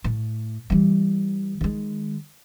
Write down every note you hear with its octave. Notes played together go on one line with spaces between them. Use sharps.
A2
E3 G3
D#3 G#3